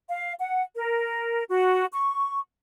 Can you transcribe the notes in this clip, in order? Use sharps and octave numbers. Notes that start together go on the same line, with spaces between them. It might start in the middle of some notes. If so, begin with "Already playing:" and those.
F5
F#5
A#4
F#4
C#6